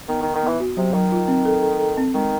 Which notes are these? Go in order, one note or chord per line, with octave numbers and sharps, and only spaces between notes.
D#3 B3
D#3
D#4
D#3
E3 B3
F#4
C3 F#3
D#3 F#3
F4
C4
A4
A4
A4
C4
D#3 G#3